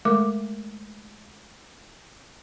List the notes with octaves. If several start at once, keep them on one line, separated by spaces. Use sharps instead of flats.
G#3 A3 A#4 D6